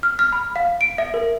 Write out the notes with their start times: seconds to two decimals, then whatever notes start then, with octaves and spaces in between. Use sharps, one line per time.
0.03 F6
0.19 F6
0.32 B5
0.56 F5
0.81 D7
0.98 E5
1.14 A#4